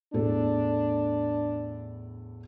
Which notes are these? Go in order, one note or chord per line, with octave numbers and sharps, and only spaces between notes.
E2 A2 D4 A4